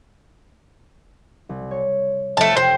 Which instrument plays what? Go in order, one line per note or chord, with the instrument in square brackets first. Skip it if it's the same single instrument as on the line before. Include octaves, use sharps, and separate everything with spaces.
[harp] C2
C#5
[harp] F1 C5 F#6 [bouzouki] A3 A5
[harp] F1 G5 [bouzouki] C5